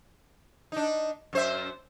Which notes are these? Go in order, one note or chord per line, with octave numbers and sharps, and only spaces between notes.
D4 D#4
F#2 C5 E5